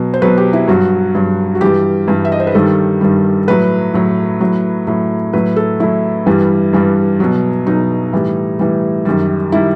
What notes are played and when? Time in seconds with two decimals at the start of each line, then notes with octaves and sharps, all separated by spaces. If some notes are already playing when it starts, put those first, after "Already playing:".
Already playing: B2 F#3
0.14 C5
0.22 B2 F#3 B4
0.38 G4
0.53 E4
0.68 G2 F#3 F#4
1.15 G2 F#3
1.55 F#4
1.61 G2 E3 G3 G4
2.08 G2 E3 G3
2.25 E5
2.32 D#5
2.40 C5
2.47 B4
2.55 G2 D#3 G3 A4
3.01 G2 D#3 G3
3.47 A2 F#3 B4
3.94 A2 F#3
4.40 A2 F#3
4.87 A2 F#3
5.33 A2 F#3 B4
5.56 A4
5.80 A2 F#3 E4
6.26 G2 E3 G3
6.73 G2 E3 G3
7.20 B2 F#3
7.67 B2 F#3 D#4
8.13 A2 E3 G3
8.59 A2 E3 G3
9.05 F#2 D#3 G3
9.52 D#3 G3 E4